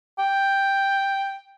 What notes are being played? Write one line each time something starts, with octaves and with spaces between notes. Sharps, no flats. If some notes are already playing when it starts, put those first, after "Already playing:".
G5